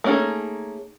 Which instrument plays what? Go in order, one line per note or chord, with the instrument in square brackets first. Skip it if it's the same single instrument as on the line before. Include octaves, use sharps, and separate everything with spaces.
[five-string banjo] A3 A#3 C#4 D#4 G#4